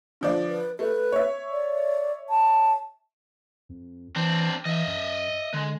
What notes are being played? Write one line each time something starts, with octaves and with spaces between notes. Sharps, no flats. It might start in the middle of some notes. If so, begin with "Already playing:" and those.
D3 F3 D5
B4
A3 B4
C#5 E5
D5
A5
F2
E3 C4 D4
E3 D#5 E5
F#2
D3 G#3